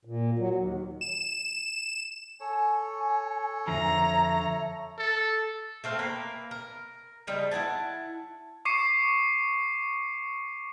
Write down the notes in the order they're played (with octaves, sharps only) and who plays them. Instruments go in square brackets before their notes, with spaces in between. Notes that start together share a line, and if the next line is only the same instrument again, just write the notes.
[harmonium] A#2
F#3
D#2
[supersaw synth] E7
[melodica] A4 C#5 [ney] G#5
[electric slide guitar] F2 D3 F3 [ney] E5 [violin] A#5 A#6
[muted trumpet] A4
[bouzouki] A3 C4 F5
A#3 A#4 B4
A#4
C#3 F3 G3 D#4
E4 F#5 G#5 A5
[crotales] C#6 D6 C7 C#7 D#7